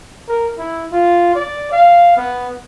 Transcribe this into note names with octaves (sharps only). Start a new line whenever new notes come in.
A#4
E4
F4
D5
F5
B3